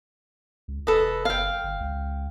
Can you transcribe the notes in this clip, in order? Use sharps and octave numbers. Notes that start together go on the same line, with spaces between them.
C#2
E1 A4 B4 D#5
F#1 F5 G5
G1
C#2